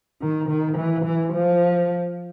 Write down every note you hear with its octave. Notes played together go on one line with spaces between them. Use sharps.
D#3
D#3
E3
E3
F3